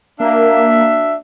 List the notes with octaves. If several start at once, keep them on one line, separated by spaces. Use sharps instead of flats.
A#3 D4 F#4 E5